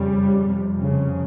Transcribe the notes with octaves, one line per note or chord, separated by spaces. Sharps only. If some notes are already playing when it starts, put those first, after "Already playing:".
Already playing: F2 C#3 G3
F2 C3
C#3